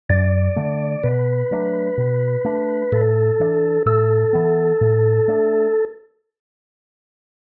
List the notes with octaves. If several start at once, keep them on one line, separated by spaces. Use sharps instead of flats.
F#2 D5
D3 A3
B2 B4
F#3 A3 D4
B2
A3 D4
A2 A4
E3 D4
A2 A4
E3 B3
A2
A3 D4